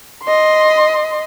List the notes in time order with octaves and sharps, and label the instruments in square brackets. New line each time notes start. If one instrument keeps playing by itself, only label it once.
[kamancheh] D#5 C6